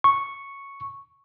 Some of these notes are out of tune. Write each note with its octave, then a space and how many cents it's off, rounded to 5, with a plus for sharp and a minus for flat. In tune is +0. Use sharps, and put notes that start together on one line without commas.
C#6 -5